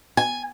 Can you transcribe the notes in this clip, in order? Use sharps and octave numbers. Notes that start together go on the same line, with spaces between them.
G#5